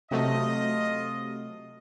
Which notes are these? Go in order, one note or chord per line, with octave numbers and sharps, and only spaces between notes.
C3 F#3 A3 F4 D#5